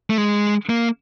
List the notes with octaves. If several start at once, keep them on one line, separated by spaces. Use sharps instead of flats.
A3
G#3
A#3